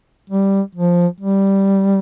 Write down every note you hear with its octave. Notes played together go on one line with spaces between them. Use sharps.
G3
F3
G3